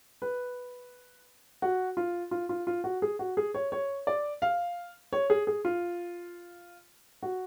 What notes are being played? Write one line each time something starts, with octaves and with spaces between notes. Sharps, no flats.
B4
F#4
F4
F4
F4
F4
F#4
G#4
F#4
G#4
C#5
C#5
D5
F5
C#5
G#4
G#4
F4
F#4